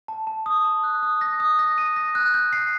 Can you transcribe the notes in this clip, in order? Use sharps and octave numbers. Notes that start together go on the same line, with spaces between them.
A5
A5
D#6
A5
F#6
D#6
A#6
D#6
A#6
D#7
A#6
F#6
G6
C7